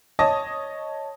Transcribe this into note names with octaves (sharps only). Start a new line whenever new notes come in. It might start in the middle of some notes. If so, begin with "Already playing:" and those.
C#5 D#5 A5 D#6 A#6